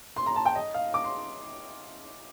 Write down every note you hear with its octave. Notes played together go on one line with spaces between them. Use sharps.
C6
A#5
A5
G5
D#5
F5
D6
C6